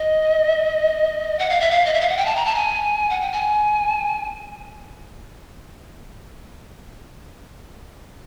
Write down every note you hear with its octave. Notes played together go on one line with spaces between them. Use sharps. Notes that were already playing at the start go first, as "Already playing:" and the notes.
Already playing: D#5
F#5
F5
E5
F5
D#5
E5
F5
F#5
G5
A5
A#5
A5
G#5
F#5
G5
G#5